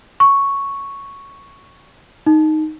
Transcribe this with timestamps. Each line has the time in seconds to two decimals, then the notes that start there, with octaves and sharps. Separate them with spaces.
0.20 C#6
2.27 D#4